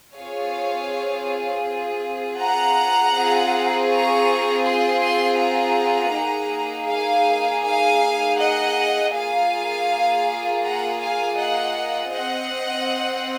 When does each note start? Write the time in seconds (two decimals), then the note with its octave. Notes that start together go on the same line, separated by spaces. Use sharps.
0.16 C4 F4 G#4 C#5 F5
2.40 F#5 A#5
3.16 C4 F4 G#4
3.90 A#5 C#6
4.65 G#5 C6
5.02 G#5 C6
5.40 F#5 A#5
6.14 A#3 D#4 G#4
6.89 F5 G#5
7.64 F5 G#5
8.38 D#5 F#5
9.14 A#3 F4 G#4 F5 G#5
10.63 F#5 A#5
11.01 F5 G#5
11.39 D#5 F#5
12.12 C4 D#5 F#5